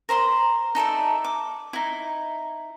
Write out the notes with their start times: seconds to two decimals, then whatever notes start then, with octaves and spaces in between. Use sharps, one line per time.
0.09 A#4 C5 B5 C6
0.75 D#4 A4 D5 E5
1.24 D6
1.73 D#4 E4